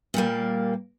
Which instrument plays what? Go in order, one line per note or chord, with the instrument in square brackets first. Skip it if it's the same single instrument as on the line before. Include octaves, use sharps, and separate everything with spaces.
[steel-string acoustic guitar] A#2 G3 A#3